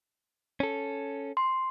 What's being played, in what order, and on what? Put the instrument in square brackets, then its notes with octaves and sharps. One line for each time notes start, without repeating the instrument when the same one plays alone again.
[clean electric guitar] C#4 A4
[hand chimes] C6